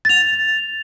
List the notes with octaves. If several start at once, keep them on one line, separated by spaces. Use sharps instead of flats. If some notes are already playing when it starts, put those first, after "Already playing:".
A6 F7